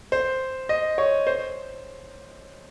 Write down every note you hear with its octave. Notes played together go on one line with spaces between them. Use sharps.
C5
D#5
C#5
C5